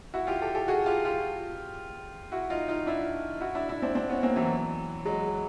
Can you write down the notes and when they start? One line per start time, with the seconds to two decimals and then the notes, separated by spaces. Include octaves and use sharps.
0.14 E4 F#4
0.27 F4 G4
0.42 G4 A4
0.55 G4 A4
0.68 F#4 G#4
0.86 F4 G4
1.05 F4 G4
2.32 E4 F#4
2.50 D#4 F4
2.68 D#4 F4
2.86 D4 E4
3.41 E4 F#4
3.55 D4 E4
3.69 D4 E4
3.82 C4 D4
3.95 C4 D4
4.09 B3 C#4
4.23 A#3 C4
4.36 E3 F#3
5.05 F#3 G#3